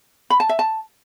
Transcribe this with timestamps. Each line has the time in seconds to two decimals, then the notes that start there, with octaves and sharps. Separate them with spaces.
0.30 B5
0.40 A5
0.49 E5
0.59 A5